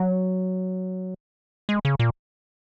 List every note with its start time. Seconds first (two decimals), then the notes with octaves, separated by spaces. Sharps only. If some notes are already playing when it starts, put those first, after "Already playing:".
Already playing: F#3
1.69 G#3
1.85 C#3
1.99 A#2